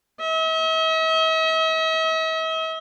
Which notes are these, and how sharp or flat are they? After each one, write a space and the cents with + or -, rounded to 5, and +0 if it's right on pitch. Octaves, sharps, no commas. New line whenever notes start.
E5 -45